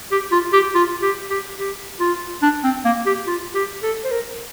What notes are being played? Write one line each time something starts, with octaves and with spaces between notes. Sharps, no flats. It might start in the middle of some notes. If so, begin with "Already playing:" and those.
G4
F4
G4
F4
G4
G4
G4
F4
D4
C4
A#3
G4
F4
G4
A4
C5
A#4